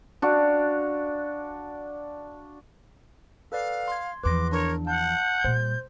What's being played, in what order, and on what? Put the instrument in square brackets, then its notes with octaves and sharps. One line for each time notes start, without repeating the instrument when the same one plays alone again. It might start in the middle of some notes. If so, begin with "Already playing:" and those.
[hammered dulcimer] D4 F#4 F5
[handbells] A4 B4 D5 [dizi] F5
[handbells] C6 G#6
[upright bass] E2 F3 [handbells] B4 C6 A#6 [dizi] D6
[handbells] D4 [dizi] A#4 [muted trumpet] C#5
[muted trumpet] F#5 [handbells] A5 [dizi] G6
[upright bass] A#2 G3 [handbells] C5